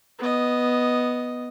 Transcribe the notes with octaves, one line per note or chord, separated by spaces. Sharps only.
B3 D#5